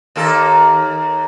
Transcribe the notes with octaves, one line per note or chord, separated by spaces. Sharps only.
D#2 A#3 A4